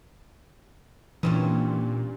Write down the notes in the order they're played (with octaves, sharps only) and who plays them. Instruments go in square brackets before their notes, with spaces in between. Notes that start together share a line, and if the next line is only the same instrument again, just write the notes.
[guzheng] G2 C4 C#4 [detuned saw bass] A#2 [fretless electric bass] E3